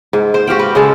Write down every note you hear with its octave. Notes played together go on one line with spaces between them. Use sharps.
G#2
C5
F#4 G4 F5 G5
B4
C#3 G#3 A4